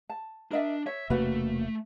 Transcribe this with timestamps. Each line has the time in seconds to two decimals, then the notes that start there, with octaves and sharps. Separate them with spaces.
0.09 A5
0.51 D4 A#4 D#5 E5
0.86 C#5 E5
1.10 E1 C3 A3 A#3 C#4 F#4 B4